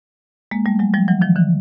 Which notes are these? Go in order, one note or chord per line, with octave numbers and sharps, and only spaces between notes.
G#3 A#3
G3 A3
F#3 G#3
F3 G3
E3 F#3
D#3 F3
D3 E3